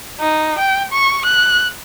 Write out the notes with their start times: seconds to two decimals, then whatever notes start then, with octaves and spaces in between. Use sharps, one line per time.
0.20 D#4
0.59 G5
0.92 C#6
1.26 F#6